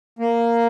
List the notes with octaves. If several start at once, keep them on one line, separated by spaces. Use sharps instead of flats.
A#3